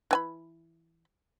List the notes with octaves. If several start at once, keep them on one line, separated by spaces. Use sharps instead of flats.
E3 G#5 B5